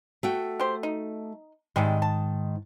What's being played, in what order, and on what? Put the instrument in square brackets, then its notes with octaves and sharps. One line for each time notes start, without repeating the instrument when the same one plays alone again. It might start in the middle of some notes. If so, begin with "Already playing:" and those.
[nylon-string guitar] A3 F#4 G5
[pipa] G4 C5
D#4
[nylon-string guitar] G#2 D#3 [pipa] C3 G3 G#3
[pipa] A5